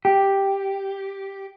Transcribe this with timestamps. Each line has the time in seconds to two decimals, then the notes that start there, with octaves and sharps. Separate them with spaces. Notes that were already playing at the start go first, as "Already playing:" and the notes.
0.05 G4